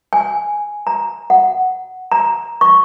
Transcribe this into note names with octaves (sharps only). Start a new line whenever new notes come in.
G#5
A#5
F#5
A#5
C#6